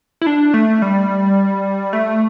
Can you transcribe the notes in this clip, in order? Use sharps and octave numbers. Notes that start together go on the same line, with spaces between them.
E4
D4
A3
G3
A3